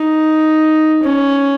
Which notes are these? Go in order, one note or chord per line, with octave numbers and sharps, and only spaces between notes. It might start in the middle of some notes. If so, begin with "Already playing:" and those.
Already playing: D#4
C#4